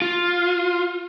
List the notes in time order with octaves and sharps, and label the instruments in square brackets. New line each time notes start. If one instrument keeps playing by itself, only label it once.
[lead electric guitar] F4